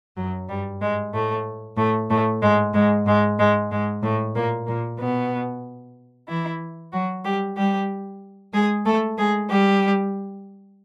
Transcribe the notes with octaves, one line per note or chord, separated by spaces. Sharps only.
F#2 F#3
G2 G3
G#2 G#3
A2 A3
A2 A3
A2 A3
G#2 G#3
G#2 G#3
G#2 G#3
G#2 G#3
G#2 G#3
A2 A3
A#2 A#3
A#2 A#3
B2 B3
E3 E4
F#3 F#4
G3 G4
G3 G4
G#3 G#4
A3 A4
G#3 G#4
G3 G4